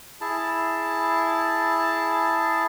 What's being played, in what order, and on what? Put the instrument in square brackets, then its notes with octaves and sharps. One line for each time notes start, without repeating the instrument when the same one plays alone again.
[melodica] E4 G#4 A5